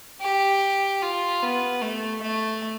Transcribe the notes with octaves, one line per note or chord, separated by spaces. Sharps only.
G4
F4
B3
A3
A3